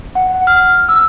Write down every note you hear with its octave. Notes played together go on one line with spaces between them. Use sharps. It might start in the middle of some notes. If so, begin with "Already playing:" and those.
F#5
F6
E6